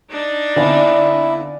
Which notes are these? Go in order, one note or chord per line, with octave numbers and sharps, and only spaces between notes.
D4 D#4
D3 B3 C4 E4 D5 F5 G#5